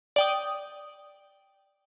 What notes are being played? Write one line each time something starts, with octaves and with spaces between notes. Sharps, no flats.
D5 G5 D#6